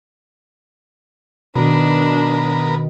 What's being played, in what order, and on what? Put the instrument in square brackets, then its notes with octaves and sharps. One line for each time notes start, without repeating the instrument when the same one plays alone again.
[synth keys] B2 D#3 [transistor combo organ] B3 A#4 [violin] D4